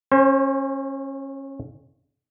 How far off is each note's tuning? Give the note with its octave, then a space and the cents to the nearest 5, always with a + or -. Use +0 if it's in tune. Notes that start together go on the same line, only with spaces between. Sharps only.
C#4 -25 C5 +30